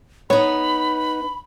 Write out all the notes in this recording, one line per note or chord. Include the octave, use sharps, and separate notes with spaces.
B3 D#4 C#5 B5